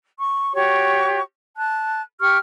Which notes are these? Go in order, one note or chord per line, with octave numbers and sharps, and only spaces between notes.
C#6
F#4 G4 C#5 C#6
A5 F#6
G4 C#6 F6